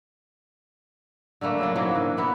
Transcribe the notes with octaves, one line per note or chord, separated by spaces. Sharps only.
D3 G3 A3 A#3
C#3 F#3 D4
G#2 E3 F#3 A#3
D3
E3 B3 E4